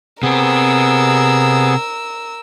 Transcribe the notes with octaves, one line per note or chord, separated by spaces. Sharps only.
C3 B3 C4 G#4 A#4 E6